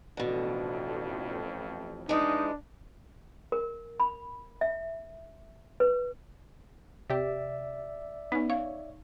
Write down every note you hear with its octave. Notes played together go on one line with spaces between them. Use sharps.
A1 F2 B2 D3
E3 G#3 D4 D#4
A#4
B5
E5
B4
C3 G4 D5 E5
B3 C#4 D#4
C#5 F5